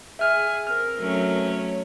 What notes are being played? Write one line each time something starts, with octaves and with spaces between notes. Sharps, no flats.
G#4 E5 G#5 F6
C4 A#4 F6
F#3 A3 C#4
C#5